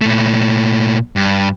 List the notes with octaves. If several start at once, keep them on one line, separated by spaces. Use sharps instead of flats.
A#2 A3
G2